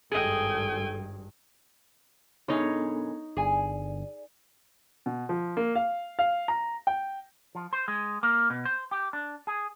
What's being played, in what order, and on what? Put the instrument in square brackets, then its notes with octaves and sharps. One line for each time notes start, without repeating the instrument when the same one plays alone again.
[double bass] G#1 G2 [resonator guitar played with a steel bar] G#4 D#5 [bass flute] A4 [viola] G5 G#5
[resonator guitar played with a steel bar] F#2 B2 G#4 [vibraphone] B3 D4 A4 [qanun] D#4 C#5
[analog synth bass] G1 [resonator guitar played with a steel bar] G#4 G#5 [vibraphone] D5
[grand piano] B2
F3
A#3
F5
F5
A#5
G5
[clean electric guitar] F3
C5
G#3
A#3
B2
C5
G4
D4
G#4